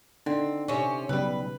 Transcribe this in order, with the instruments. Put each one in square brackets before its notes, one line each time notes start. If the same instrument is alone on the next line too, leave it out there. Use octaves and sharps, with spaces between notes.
[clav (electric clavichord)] D3 [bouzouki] C4 [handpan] D#4
[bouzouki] C3 C#4
[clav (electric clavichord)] B1 G3 [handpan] C#3 [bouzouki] B4